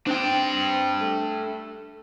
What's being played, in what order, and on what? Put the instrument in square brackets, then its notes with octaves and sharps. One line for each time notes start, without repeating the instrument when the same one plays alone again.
[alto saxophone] C4 [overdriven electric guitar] D4 G5
[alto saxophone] A3